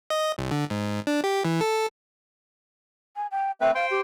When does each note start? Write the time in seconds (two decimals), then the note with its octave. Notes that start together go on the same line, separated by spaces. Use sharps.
0.10 D#5
0.38 C2
0.51 D3
0.70 G#2
1.07 D4
1.24 G4
1.45 E3
1.61 A4
3.16 G#5
3.31 G5
3.61 A3 C4 B4 G5
3.75 C5 F5 G5 C6
3.90 G4